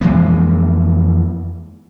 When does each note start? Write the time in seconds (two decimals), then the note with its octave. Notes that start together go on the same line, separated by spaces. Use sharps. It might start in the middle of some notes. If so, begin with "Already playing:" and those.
0.01 F2 E3 G#3 A#3